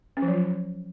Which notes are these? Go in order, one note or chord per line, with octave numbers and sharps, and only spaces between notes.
C#4
F3
F#3
F4